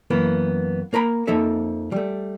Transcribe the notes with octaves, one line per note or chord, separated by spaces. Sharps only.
F#2 E3 A#3 B3
A#3 A#4 A#5 B5
F2 F3 A#3 D#4 A4 E5
G3 A3